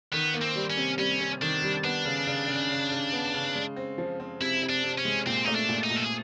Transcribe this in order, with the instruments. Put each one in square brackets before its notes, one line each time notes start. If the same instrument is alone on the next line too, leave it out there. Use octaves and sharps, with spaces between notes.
[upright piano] D#3 [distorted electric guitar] B3
[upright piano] A#3
[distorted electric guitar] C4
[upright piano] G3
[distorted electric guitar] C#4
[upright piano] C3
[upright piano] G3 [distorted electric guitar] C#4
[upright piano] C3
[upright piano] D#3 [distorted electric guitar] D4
[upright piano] G3
[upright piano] B3 [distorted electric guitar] D4
[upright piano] C#3
C#3
C#3
C#3
C#3
B3
C#3
G#3
C4
F3
C4
[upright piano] C3 [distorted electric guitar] E4
[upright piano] C3
[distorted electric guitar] D4
[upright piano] C3
[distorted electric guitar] C#4
[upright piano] G#3
[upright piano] A#2 [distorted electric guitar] C4
[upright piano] A3 [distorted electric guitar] D#4
[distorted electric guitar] D4
[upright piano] A#2
[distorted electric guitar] D#4
[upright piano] A#2
[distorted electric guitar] A4
G#4